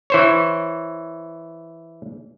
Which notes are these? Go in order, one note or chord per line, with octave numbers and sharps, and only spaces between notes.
E3 C5 C#5